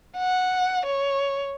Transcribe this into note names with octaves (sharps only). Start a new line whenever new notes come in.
F#5
C#5